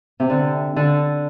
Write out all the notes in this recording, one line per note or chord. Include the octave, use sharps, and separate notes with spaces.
C3
D3
D3